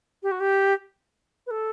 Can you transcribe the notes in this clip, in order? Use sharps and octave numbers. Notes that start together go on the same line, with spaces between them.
G4
F#4
G4
B4
A4